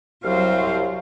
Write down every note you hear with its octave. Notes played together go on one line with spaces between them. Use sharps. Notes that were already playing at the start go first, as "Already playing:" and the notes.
C2 F#3 C5 F5